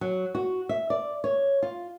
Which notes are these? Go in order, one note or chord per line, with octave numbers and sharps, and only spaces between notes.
F#3
F#4
E5
D5
C#5
F4